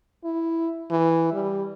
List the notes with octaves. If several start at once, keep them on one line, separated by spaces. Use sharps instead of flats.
E4
E3
G3